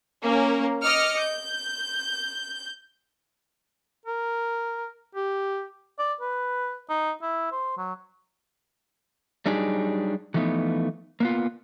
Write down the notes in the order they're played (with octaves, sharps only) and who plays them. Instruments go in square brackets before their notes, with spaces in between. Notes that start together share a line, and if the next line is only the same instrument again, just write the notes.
[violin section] A#3 C#4 A#4
D#5 D6 F6 C#7
G6
[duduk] A#4
G4
[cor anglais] D5
B4
D#4
E4
C5
F#3
[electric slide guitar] F#3 G3 D4 D#4 G4 G#4
E3 F3 A3 B3 D#4
A#3 B3 F4